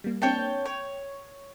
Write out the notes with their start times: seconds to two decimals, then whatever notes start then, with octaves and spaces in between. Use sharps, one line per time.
0.04 G3 A#3
0.22 A#3 C4 D4 C#5 G5 A5
0.66 C#5 G5